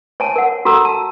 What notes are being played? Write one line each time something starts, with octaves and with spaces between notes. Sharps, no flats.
C#5 G#5 A5
A#4 F#5
F#4 A4 A#5 E6
A5